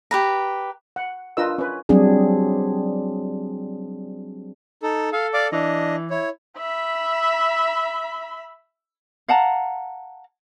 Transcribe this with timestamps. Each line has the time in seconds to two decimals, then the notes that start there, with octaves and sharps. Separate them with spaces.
0.11 G4 B4 A#5
0.96 F#5
1.37 D4 F4 A#4 B4 D#5 E6
1.58 C#4 B4
1.89 F#3 G3 C4 D4 G#4
4.82 D#4 A4
5.13 A4 F5
5.33 D5 F5 D6
5.52 E3 D4 D#5
6.10 E4 C#5
6.58 E5 B5
9.28 F5 F#5 A5 A#5